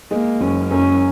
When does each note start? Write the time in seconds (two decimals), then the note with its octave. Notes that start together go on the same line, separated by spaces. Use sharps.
0.11 G#3 A#3
0.41 F#1 C#4
0.71 F#2 C#4